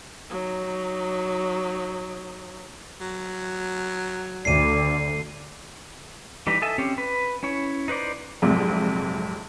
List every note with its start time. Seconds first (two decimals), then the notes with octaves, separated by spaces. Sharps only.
0.30 F#3 D#4
3.01 F#3
4.45 D2 D3 D5 C7 D#7
6.47 E3 G3 D#4 B4
6.62 A4 D#5 E5 G#5 A5
6.78 C4 C#4 G4
6.98 B4
7.43 C#4 E4 C#5
7.88 D#4 B4 C5 D5
8.42 A#1 F2 G#2 C3 F#3